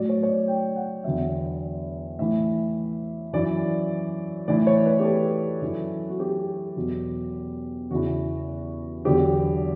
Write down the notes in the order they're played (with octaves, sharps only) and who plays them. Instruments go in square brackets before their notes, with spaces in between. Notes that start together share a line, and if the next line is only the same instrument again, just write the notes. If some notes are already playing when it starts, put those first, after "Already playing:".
Already playing: [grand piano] A2 F#3 D5
C#5
C#5
D5
G5
F#5
E2 D3 F#3 E5
A2 E3 E5
F#2 E3 D5
A2 E3 D5
C#5
B4
G4
A4
F#2 E3
F#4
G4
E2 B2 F#3
E2 C#3 E3 F#4
E2 D3 F#3 G4